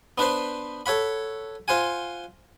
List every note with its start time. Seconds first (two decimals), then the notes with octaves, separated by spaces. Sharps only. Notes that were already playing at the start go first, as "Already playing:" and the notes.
0.18 B3 D4 B4 C5
0.86 A4 C#5 F#5 B5
1.68 F4 C5 F#5 G#5